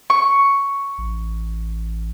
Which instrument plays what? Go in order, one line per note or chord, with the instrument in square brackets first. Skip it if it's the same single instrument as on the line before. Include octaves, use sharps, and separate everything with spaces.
[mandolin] C#6
[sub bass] A1